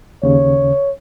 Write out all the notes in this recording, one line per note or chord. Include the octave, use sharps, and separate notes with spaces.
D#2 C#3 C#5